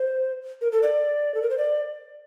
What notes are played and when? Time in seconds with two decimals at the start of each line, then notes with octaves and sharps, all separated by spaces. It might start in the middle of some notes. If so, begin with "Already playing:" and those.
Already playing: C5
0.61 A#4
0.72 A4
0.83 D5
1.34 A4
1.42 A#4
1.50 C5
1.58 D5